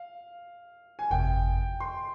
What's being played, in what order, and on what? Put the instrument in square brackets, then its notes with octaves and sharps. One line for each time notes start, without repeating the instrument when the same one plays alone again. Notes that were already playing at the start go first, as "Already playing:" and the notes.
Already playing: [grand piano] F5
G#5
[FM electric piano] G1 F2 C3 [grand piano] G5
[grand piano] C6